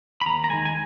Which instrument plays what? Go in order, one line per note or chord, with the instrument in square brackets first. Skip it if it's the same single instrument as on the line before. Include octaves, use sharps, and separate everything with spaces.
[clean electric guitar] B5
D#2 A#5
A#5
D#3 G#3 G#5
G#5